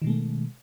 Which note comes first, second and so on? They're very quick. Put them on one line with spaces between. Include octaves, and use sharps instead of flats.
D#3 B2 G#3 A3